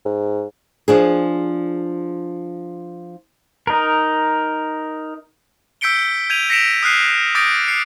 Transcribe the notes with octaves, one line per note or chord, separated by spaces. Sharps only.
G#2
F3 D4 G#4
D#4 A#4
E6 G6 B6 C#7 D7 G7
G6 G#6 D#7 F7
A#6 B6 C#7 D7 E7 F7
D#6 F6 F#6 C7 D#7
D6 D#6 G6 A6 A#6 D7
C7 C#7